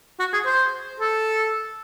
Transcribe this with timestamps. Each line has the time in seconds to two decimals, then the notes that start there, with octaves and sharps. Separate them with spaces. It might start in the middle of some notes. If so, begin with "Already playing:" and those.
0.20 F#4
0.33 G#4
0.46 C5
1.00 A4